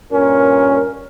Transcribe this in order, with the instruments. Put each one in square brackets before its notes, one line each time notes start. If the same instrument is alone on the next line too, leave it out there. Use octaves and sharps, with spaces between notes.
[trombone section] G2 A#2 C#4 [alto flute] A#4